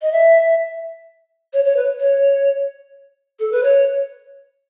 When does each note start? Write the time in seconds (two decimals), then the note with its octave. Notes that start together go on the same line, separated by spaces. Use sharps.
0.02 D#5
0.12 E5
1.53 C#5
1.65 C#5
1.76 B4
1.99 C#5
3.39 A4
3.52 B4
3.63 C#5